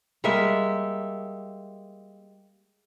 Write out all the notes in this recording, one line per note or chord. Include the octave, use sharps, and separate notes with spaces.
G3 G#3 A#3 E5